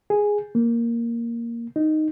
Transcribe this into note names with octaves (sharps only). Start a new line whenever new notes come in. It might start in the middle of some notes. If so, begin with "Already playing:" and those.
G#4
A#3
D#4